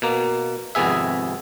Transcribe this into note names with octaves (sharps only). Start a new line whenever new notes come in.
B2 A#3
G#1 F2 C3 B3 G#4 E5